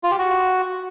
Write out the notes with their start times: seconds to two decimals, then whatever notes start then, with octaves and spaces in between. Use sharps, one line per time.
0.04 F4
0.11 G4
0.19 F#4